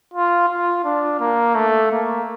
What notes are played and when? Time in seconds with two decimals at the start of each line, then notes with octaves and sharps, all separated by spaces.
0.14 F4
0.49 F4
0.84 D4
1.20 A#3
1.55 A3
1.92 A#3